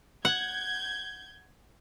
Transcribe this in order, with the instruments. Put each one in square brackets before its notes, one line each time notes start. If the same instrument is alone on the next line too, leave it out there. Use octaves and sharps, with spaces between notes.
[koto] F#5 [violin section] G6 G#6